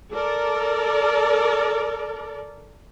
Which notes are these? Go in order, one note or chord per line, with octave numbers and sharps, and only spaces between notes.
A4 A#4 D5